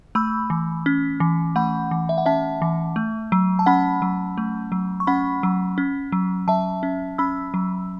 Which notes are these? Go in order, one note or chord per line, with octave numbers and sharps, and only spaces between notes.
A3 B5 E6
E3
C#4
E3
A3 F#5 B5
E3
E5
F#5
C#4 E5 A5
E3
A3
F#3
A5
C#4 F#5 B5
F#3
A3
F#3
C#6
C#4 F#5 B5
F#3
C#4
F#3
F#3 E5 A5
C#4
C#4 B5 E6
F#3